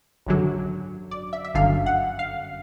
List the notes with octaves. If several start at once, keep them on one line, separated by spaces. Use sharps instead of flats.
G#1 F#2 D3 F#3
D5
E5
E5
G1 F#2 D3 F5
F#5
F5